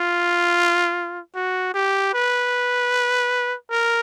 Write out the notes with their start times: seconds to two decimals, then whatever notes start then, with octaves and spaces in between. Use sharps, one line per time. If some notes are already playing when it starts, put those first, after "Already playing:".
Already playing: F4
1.35 F#4
1.74 G4
2.14 B4
3.71 A#4